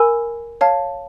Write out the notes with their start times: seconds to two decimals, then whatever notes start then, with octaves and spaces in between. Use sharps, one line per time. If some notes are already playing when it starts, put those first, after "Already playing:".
Already playing: A#4 G#5 B5 E6
0.61 C#5 F5 A5